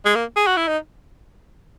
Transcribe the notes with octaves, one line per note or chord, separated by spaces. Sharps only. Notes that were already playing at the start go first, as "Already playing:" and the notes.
G#3
A#3
G#4
F#4
E4
D#4